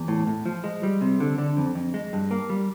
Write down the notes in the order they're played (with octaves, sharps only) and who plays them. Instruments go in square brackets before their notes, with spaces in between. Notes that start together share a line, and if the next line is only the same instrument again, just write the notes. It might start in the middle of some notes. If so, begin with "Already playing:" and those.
Already playing: [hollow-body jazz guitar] E2
A2
A2
F3
G#3
G3
C3
D3
D3
F2
F2
G#3
G2
A#3
G3